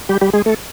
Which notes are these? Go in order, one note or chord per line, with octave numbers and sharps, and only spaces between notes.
G3 G4
G3 G4
G#3 G#4
A3 A4